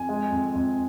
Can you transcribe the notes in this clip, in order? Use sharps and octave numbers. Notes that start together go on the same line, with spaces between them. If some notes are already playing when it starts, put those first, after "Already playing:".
Already playing: F2 G#5
G#3
F2
F2